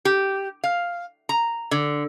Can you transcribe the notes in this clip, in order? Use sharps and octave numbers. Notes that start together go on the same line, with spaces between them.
G4
F5
A#5
D3